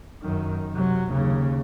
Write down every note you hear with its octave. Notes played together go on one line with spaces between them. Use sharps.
F#2 D#3
C3 F#3
D#2 C#3